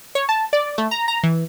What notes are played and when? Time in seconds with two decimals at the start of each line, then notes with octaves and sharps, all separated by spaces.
0.15 C#5
0.29 A5
0.53 D5
0.78 A3
0.91 A#5
1.08 A#5
1.23 E3